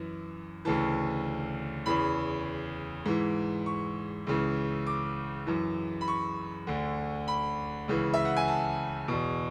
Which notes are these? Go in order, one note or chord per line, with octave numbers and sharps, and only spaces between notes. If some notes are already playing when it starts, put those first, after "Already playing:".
Already playing: F#2 E3
D2 C#3 E3 A5
E2 C#3 E3 B5
G#2 E3
C#6
C#2 C#3 E3
D6
F#2 E3
B5
C#6
D2 D3
B5
C#2 C#3 E3
E5
F#5
G#5
A5
E2 B2